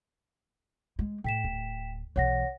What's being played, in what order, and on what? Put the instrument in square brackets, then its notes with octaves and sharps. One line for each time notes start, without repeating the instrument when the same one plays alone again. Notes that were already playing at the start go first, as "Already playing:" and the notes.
[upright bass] G#3
[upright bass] A2 [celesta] G5 B6 E7
[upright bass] D1
[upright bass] B1 E3 [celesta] C#5 F#5 A#6